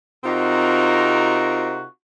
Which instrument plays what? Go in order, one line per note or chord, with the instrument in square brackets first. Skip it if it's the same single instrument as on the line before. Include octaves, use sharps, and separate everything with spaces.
[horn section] C3 C4 D#4 F4 F#4 A#4